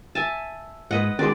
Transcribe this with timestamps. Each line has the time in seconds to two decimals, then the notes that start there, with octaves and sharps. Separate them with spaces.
0.15 E5 G#5 A5
0.91 G#2 B4 D#5 F#5
1.19 D#3 G#3 C#4 F#4 D5 D6